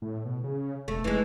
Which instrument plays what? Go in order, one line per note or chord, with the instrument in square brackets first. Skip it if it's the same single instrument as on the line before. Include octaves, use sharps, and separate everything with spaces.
[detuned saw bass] A2
B2
C#3
[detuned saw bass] E1 [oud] A3
[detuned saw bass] F1 [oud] E3 G#3